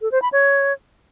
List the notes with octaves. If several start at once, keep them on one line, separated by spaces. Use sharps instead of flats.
A4
C5
B5
C#5